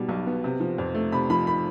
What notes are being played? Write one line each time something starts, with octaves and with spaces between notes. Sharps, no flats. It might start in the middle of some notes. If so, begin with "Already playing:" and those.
Already playing: B2 G3 B3
B1
B3
C3
F3
F2
A3
C3 B5
F3 B5
B5